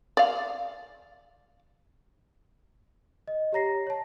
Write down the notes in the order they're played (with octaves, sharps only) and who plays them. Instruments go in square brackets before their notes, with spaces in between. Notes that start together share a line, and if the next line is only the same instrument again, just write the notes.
[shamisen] D5 F5
[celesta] D#5
G4 C#5 A#5 A#6 C7
C#5 A5